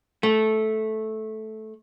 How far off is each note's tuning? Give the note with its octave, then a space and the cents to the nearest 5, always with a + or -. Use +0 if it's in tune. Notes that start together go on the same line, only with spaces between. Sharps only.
A3 -10